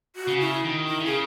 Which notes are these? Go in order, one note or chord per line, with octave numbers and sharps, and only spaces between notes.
F#4
C#3
E4
D#3
E4
C#3 G#4